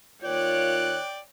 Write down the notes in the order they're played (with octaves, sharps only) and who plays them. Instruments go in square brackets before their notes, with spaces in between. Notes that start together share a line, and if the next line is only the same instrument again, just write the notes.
[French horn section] D#3 A#3 F4 [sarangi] C#5 [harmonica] D5 G5 [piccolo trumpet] F#6